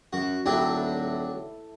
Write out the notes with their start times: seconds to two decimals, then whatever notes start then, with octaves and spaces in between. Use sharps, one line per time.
0.13 F#2 F#4
0.46 D#1 F#3 D4 E4 A4 G5